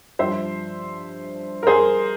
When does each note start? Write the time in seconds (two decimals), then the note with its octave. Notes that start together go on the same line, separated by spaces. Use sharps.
0.19 G2 F3 C5 E5
1.63 A#4
1.67 G#4 C5